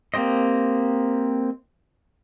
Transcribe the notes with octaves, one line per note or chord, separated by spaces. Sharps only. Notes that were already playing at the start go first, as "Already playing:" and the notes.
A#3 C4 G4 C5 D#5